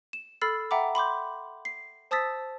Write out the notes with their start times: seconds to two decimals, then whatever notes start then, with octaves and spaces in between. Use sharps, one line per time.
0.13 E7
0.42 A4 B5 E6 F6 A6 C7
0.71 E5 F#5 G5 A#5 B5 D6
0.95 B5 C6 D6 G6
1.65 C7
2.11 C5 A5 D#6 E6 A6 B6